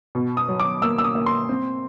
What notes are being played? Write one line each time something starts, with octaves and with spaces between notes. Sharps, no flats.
B2
D#6
F#3
D6
A#3 E6
E6
D#6
A#3
C6
C4